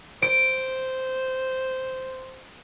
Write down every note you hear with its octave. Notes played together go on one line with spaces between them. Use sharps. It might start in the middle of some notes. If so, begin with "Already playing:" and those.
C5 D7